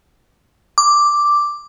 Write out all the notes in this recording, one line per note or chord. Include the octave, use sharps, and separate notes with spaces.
D6